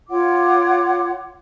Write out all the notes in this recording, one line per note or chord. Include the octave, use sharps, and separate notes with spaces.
F4 C#5 F#5 D6